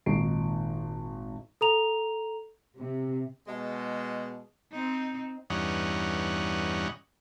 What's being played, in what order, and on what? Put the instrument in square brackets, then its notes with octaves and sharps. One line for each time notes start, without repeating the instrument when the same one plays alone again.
[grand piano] G#1 A#2 D#4 C#6 C7 D7
[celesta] A4 A#5 F7
[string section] C3
[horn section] B2 G#3
[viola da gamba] C4 D#4
[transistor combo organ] E2 G2 C#4 D#4 F#5